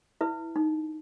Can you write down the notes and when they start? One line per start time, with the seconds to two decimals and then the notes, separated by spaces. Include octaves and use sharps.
0.21 E4 B4 E5
0.56 D#4